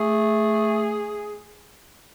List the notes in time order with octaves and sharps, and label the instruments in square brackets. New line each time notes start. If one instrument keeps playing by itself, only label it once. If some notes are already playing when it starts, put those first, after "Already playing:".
Already playing: [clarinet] A3 [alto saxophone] G#4